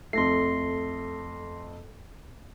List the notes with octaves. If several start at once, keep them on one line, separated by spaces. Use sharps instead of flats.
F2 A3 C6 A#6 C7